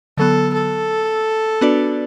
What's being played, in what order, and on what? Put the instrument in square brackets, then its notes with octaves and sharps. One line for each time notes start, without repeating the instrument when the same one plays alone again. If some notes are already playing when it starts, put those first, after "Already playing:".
[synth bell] D3 F#3 B3 [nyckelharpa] A4
[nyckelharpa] A4
[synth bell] B3 D4 F#4 B4 D5